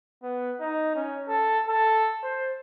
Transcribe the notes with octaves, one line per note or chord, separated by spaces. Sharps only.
B3
D#4
C#4
A4
A4
C5